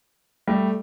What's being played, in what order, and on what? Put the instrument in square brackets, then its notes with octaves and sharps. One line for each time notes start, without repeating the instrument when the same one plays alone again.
[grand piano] G3 A3